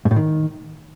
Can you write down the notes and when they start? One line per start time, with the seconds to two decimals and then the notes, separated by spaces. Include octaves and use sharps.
0.05 G#2
0.11 A2
0.16 D#3